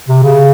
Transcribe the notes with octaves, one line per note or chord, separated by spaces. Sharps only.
C3
C#3